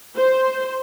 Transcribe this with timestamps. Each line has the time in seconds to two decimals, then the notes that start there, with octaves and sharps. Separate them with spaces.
0.16 C5